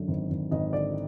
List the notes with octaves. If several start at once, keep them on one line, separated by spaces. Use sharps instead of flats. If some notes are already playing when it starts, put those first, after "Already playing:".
Already playing: F#2 D3
G#1
G#1
G#1 D#5
D3 D5